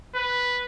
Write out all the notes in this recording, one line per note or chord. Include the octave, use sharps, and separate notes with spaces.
B4